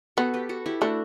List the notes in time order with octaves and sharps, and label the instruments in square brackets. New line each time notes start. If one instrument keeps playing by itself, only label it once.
[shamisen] B3 [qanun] F#4 A4
[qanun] G4 B4
F#4 A4
E4 G4
[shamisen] A3 [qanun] D4 F#4